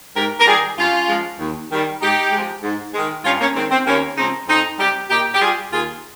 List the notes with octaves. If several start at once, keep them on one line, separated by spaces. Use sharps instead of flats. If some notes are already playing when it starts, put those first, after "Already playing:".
G#2 G4 A#4
A#4
D#3 G3 F4 G#4
G2 C#4 F4
F3 G#3
D#2
D#3 G3
G#2 D#4 G4
F3 G#3
G#2
D#3 G#3
G2 C#4 F4
A#3 C#4
D#3 G#3 C4
C4
D#2 A#3 C#4
C#3 F3 G#3 C4 D#4
F2 C4 D#4
C3 G3 D#4 G4
A#2 D#4 G4
G4
G3 F4 G#4
D#2 F4 G#4